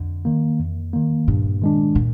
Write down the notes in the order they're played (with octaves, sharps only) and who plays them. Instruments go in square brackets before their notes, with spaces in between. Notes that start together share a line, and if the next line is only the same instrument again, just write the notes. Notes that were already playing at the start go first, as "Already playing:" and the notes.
Already playing: [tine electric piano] F2 [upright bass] D3
[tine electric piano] D#3 A#3
F2
D#3 A#3
[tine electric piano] G2 [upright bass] A#2
[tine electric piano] D#3 G#3 D4
[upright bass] A#2